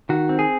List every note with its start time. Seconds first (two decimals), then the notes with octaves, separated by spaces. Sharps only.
0.09 D#3 F#4
0.29 C4
0.39 G#4